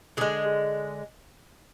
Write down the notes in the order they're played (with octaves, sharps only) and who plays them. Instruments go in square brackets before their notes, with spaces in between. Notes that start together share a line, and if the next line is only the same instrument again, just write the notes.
[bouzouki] D3 G#3 G#4